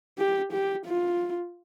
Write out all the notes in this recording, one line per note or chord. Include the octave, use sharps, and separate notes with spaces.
G4
G4
F4